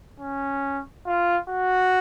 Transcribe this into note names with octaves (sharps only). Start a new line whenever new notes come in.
C#4
F4
F#4